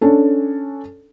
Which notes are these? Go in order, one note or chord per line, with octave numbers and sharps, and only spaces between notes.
C#4 D4 A4